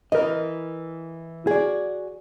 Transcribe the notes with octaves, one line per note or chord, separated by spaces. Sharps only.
E3 A#4 D#5
F#4 G#4 D5